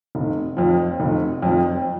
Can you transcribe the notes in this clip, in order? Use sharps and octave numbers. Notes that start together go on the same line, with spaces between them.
F1
F2 F3
F1
F2 F3